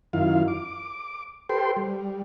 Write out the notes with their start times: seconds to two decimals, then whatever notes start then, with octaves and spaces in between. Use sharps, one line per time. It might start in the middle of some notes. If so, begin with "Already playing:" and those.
0.13 F#2 D#3 E4 F4 F5
0.48 D6
1.49 G4 A4 B4 C5 G5 C6
1.77 G3